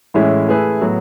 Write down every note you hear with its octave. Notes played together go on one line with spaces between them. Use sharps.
A2 E3 G#3 C#4 E4
A3 E4 G#4 B4
A2 F#3 B3 F#4